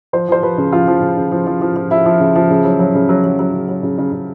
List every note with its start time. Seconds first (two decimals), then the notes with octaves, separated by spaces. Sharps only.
0.13 F3 C5
0.28 F3 C5
0.42 F3 B4
0.58 C#3
0.72 F3 F4
0.88 F3
1.02 C#3
1.17 C#3
1.32 F3
1.47 F3
1.61 F3
1.76 F3
1.91 F3 E4
2.06 F3
2.20 C#3
2.36 F3
2.50 C#3
2.65 F#3
2.79 F#3
2.95 C#3
3.09 F#3
3.24 F#3
3.39 F#3
3.54 C#3
3.68 F#3
3.83 C#3
3.98 C#3
4.13 C#3